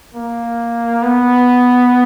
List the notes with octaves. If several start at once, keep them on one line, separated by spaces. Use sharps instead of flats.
A#3
B3